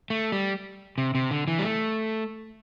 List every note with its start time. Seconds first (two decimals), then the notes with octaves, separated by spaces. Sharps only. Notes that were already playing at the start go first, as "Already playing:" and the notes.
0.10 A3
0.32 G3
0.98 C3
1.15 C3
1.31 D3
1.48 E3
1.59 G3
1.64 A3